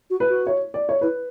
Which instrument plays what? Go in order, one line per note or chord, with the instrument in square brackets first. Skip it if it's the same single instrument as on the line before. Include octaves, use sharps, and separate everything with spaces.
[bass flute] F#4
[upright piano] B4
[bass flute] F#4
[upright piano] C#5
D5
C#5
[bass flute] E4 [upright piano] B4